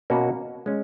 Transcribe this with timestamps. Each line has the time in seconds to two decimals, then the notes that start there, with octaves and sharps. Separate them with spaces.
0.10 B2 A#3 C#4 F#4
0.66 G#3 C#4